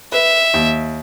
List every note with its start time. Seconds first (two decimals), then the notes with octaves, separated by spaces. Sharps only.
0.12 B4 E5
0.54 D#2